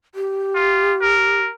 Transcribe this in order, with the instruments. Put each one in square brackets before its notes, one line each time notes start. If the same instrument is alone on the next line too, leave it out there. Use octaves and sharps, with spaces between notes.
[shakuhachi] G4
[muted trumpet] F4
A#4